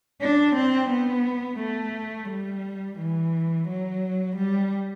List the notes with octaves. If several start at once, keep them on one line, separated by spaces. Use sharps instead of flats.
D4
C4
B3
A3
G3
E3
F#3
G3